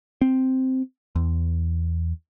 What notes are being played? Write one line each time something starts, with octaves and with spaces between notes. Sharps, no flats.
C4
E2